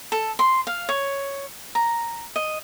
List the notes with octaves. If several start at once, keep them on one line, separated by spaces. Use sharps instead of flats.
A4
C6
F5
C#5
A#5
D#5